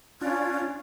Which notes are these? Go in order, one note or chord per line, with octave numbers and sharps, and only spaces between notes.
C#4 D4 F4